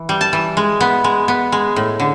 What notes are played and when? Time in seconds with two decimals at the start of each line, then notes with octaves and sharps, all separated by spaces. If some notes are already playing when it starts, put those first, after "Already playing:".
Already playing: E3
0.09 G3
0.21 A5
0.33 E3
0.57 G#3
0.80 B3
1.04 G#3
1.28 B3
1.52 G#3
1.76 A2
2.00 D3